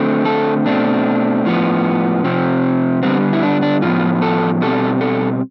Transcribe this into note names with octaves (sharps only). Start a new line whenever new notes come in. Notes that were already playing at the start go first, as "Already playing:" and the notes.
Already playing: D3 A3 C4
A4
B2 A3 C4 D4
A2 F3 B3
C3 F3 C4
D3 G3 B3 C4
E4
D4
D4
A2 F3 B3 F4
A4
B2 G3 C4 A4
A4